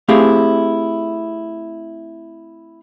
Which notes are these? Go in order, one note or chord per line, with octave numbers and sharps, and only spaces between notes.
A3 C4 E4 G4 G#4 F5